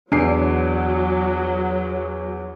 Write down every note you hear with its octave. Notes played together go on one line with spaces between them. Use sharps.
E2 F#3 D4 C7